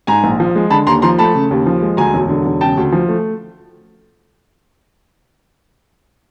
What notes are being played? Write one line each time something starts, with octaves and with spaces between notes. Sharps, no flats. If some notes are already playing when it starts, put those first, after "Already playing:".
G#2 G#5 A#5
A#1
F3
G#3
D3 A5 B5
D#2 A#5 C6
F3 A#5 C6
A3 A5 B5
C#3
D#2
F3
G#3
D2 G#5 A#5
E1
D3
E1
C#3 G5 A5
D2
F3
A3